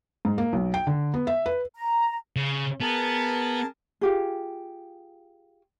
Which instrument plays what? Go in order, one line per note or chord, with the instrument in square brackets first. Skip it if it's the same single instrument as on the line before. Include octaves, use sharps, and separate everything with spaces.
[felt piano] G#2
A#3
B1
G5
D3
B3
E5
B4
[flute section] A#5
[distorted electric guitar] C#3
[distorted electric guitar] B3 [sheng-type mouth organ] G#4 A#4 A5
[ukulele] F4 G4 G#4